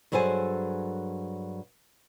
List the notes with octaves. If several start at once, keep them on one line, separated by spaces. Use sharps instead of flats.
G2 F#3 G#4 A4 C5 G#5